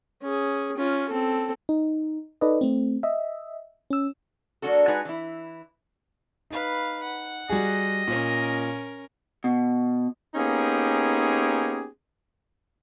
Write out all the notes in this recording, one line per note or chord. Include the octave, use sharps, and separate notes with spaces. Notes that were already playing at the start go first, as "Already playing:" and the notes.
C#4 G#4
C#4 F4
C4 A4
D#4
D#4 A4 B4 D5 D#5
A3 C4
D#5 E5
C#4 E6
F#3 A#3 D4 F#4 A4
G#3 D4 D#4 F#4 B4 G#5
E3 E4
D#4 B4 F5 B5
F#5
G3 F#4 G#4 D#5
A#2 C#4 A#4
B2
A#3 B3 C#4 D#4 G4 G#4